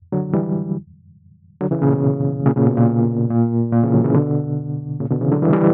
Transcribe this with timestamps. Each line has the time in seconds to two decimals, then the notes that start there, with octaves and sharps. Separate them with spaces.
0.12 D3 F#3
0.33 E3 G3
1.61 D3 F#3
1.71 C#3 E3
1.82 A#2 C#3
1.92 B2
2.45 A#2 C#3
2.56 A#2 C#3
2.67 B2
2.77 A#2
3.30 A#2
3.73 A#2
3.83 C#3 E3
3.94 D3 F#3
4.04 C#3 E3
4.15 B2 D3
5.00 A#2 C#3
5.11 B2 D3
5.21 C#3 E3
5.31 D3 F#3
5.42 E3 G3
5.53 E3 G3